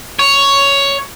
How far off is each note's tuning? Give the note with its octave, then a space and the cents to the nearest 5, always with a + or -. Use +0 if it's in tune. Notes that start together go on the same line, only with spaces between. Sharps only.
C#5 +5